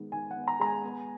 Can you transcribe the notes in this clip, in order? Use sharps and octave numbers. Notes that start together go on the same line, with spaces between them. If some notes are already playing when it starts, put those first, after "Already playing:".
Already playing: D#3 G#3 B3
D#3 G#5
F#5
B3
A#5
G#3 A#5
G#5
B3